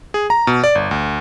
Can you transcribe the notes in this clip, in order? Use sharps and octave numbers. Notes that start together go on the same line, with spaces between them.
G#4
A#5
B2
D5
G1
D2